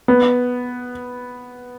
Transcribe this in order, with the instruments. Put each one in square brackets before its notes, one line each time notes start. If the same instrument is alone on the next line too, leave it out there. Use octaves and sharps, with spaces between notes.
[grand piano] B3